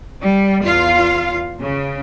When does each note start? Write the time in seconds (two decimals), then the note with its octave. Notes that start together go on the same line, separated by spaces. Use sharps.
0.20 G3
0.61 E2 F4 F5
1.61 C#3